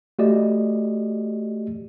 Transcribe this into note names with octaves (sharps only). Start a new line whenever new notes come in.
A3 F#4 G4 D5 D#5